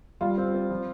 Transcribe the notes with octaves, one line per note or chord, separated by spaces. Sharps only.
G3 F4
C4
C4
F3